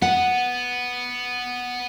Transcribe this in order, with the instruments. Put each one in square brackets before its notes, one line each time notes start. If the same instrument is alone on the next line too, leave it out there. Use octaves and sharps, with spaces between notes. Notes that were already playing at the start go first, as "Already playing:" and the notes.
[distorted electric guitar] B3 [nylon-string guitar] F#5